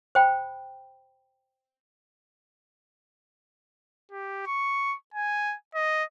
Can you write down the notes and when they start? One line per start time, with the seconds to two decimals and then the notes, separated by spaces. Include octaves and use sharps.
0.15 C5 G5 B5
4.12 G4
4.46 C#6
5.14 G#5
5.75 D#5